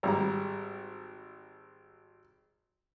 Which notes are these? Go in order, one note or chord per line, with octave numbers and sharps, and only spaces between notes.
G#1 G3 A#5